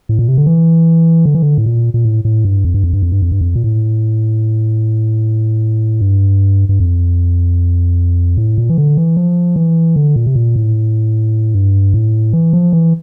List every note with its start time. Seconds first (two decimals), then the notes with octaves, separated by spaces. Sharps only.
0.09 A2
0.19 A#2
0.28 C3
0.37 D3
0.46 E3
1.25 D3
1.35 E3
1.42 D3
1.58 A2
1.66 A#2
1.94 A#2
2.05 A2
2.25 A2
2.45 G2
2.65 F2
2.74 G2
2.84 F2
2.93 G2
3.02 F2
3.12 G2
3.22 F2
3.32 G2
3.41 F2
3.56 A#2
3.64 A2
6.01 G2
6.69 G2
6.80 F2
8.37 A2
8.58 A#2
8.70 E3
8.78 D3
8.97 E3
9.17 F3
9.56 E3
9.96 D3
10.16 A#2
10.26 C3
10.35 A#2
10.56 A2
11.55 G2
11.94 A2
12.33 E3
12.53 F3
12.73 E3